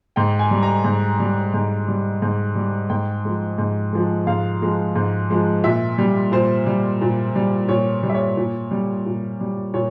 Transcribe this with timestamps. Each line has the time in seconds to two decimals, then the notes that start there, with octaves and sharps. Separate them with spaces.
0.16 G#2 G5
0.39 G#5
0.51 G3
0.63 A#5
0.84 G#2
1.20 G3
1.54 G#2
1.88 G3
2.22 G#2
2.55 G3
2.90 G#2 G5
3.25 F3 G#3
3.58 G#2
3.93 F3 G#3
4.27 G#2 F5
4.62 F3 G#3
4.96 G#2
5.30 F3 G#3
5.64 A#2 E5
5.98 G3
6.32 A#2 C5
6.67 G3
7.01 A#2
7.36 G3
7.69 A#2 C#5
8.03 G3
8.09 E5
8.14 C#5
8.37 A#2
8.71 G3
9.06 A#2
9.41 G3
9.74 A#2 C#5